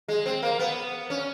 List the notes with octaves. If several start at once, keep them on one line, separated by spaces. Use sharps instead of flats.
G#3
C4
A#3
B3
C#4